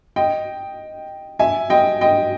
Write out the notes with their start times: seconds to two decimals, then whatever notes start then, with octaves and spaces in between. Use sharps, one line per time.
0.16 D#5 G5
1.39 E5 G#5
1.70 D#5 G5
2.01 D#5 G5